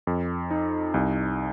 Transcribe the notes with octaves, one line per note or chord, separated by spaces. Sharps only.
F2
D#4
C2